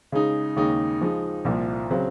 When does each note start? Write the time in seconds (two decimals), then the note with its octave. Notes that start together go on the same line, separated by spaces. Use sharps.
0.12 C#3 G#3 D#4
0.56 D#2 C#3 G#3 D#4
1.01 F3 G#3 D#4
1.45 C2 A#2 F3
1.90 C#3 F#3 C4